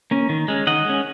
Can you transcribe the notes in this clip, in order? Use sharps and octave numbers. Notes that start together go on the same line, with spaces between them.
A#3 C#4
D#3
G#3 C#4
D#3 D#5 F#5
G#3 C#4